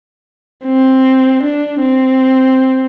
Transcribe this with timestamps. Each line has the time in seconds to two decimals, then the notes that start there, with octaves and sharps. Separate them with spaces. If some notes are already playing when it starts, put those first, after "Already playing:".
0.65 C4
1.43 D4
1.81 C4